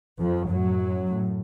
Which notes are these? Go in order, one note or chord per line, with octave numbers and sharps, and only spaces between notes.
F2 F3
F#2 A2 F#3
A2